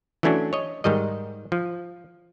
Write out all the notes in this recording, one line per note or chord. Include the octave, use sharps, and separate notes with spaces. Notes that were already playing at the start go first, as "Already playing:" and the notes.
E3 F#3 A3 C#4 D4 F#4
C#5 D#5
G#2 D#3 G3 D#5
F3